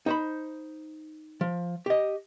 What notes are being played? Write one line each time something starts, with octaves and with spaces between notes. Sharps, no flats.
D#4 C5 B5
F3
G4 D#5